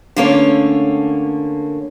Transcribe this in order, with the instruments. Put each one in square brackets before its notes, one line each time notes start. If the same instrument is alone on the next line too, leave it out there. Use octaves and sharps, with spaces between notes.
[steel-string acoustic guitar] D3 A3 A#3 C#4 C#5